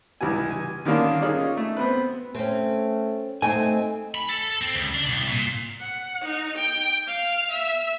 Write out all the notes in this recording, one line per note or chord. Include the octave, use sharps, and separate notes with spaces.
C#2 E3 G3 G#5
G#5
D3 D#3 G3 A#3 C#4 D4
C#4 D#4 F4 G#4
A3
B3 C4 B4
A3 C4 C#4
A3 C4 D#4 G#5
B5
A4
C4
C#2
D4
C2
A#2
F#5
D#4
G5
F5
E5